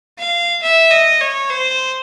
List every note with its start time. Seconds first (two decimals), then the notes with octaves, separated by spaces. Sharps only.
0.18 F5
0.62 E5
0.91 D#5
1.21 C#5
1.50 C5